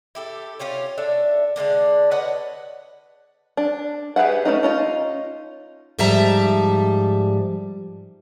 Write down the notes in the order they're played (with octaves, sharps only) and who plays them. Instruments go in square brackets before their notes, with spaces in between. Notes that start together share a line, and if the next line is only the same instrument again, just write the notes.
[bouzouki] E4 G4 A4
C#4 F4 G4 C#5
D4 A4 E5
D3 G#3 A#3 D4
B4 C#5 D#5 F#5
[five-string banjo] D4
G4 G#4 B4 E5 F#5
A3 A#3 C#4 D#4
C#4 D#4 F4
[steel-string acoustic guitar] G#2 F3 G3 E5 A5 A#5